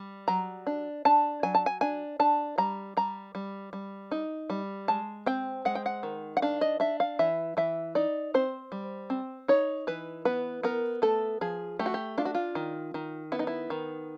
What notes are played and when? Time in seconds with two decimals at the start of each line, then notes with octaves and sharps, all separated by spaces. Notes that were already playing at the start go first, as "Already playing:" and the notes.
Already playing: G3
0.28 F#3 A#5
0.67 D4
1.05 D4 A5
1.43 F#3 G#5
1.55 A5
1.66 G#5
1.81 D4 G#5
2.20 D4 A5
2.58 G3 A#5
2.97 G3 A#5
3.35 G3
3.73 G3
4.11 D#4
4.50 G3
4.88 G#3 A5
5.26 C4 G5
5.65 G#3 F#5
5.75 G5
5.86 F#5
6.03 D#3
6.37 F#5
6.42 D4 F5
6.61 D#5
6.80 D4 E5
7.00 F5
7.19 E3 E5
7.57 E3 E5
7.95 D#4 D5
8.34 C4 C5
8.72 G3
9.10 C4
9.48 D#4 C#5
9.87 E3 B4
10.25 B3 B4
10.63 B3 A#4
11.02 A3 A4
11.41 F3 G#4
11.79 A3 G4
11.86 F#4
11.94 G4
12.18 D4 F4
12.25 F#4
12.35 F4
12.55 D#3
12.94 D#3
13.32 B3 E4
13.39 D#4
13.47 E4
13.70 D#3